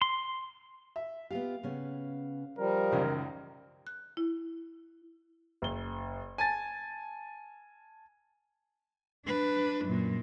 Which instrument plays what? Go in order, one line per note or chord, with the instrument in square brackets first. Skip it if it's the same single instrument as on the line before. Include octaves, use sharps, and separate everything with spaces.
[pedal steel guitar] C6
[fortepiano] E5
[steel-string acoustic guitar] B3 F4 G4 [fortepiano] F5
[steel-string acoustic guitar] C#3 B3 C#4
[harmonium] F3 G3 [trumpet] A#4
[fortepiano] C#2 F#2 D#3 [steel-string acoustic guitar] E3 D#5
[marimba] F#6
E4
[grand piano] F#1 G7
G#5 A5 A6
[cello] D4 B4
F#2 A#2